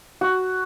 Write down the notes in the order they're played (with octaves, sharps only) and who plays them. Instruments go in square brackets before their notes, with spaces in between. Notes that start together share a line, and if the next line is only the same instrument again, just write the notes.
[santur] F#4